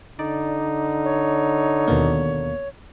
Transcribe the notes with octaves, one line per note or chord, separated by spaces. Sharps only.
D3 D#4 D5
C#5
D#2 B2 A#3